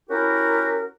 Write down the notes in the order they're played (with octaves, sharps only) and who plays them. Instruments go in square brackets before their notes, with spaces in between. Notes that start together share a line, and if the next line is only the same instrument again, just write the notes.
[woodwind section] C#4 E4 F#4 G4 A#4